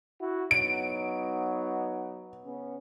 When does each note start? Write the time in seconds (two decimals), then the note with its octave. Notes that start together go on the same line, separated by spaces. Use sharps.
0.21 E4 F#4
0.51 F#3 B3 D#4 D7
2.45 C#3 B3 C#4